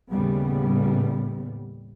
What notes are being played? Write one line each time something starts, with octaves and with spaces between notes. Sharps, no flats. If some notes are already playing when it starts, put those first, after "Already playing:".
D#2 A2 C#3 G3 B3